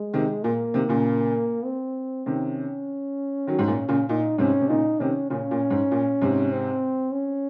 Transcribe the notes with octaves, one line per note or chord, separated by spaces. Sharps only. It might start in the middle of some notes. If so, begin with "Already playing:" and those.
Already playing: G#3
C3 D#3
A#2 A#3
C3 D#3
A#2 C#3
C4
C3 D#3 C#4
D#3 F#3
G#2
A#2
A#2 C#3
A#2 D#4
G#2 C3 C#4
C3
A#2 C#3 D#4
C3 D#3 C#4
A#2 C#3 C#4
A#2
G#2
A#2
G#2 C3
C4
C#4